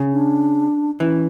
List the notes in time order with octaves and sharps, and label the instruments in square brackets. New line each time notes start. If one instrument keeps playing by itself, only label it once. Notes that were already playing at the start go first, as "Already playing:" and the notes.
Already playing: [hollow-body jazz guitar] C#3
[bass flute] D4
[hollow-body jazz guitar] E3 [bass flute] C#4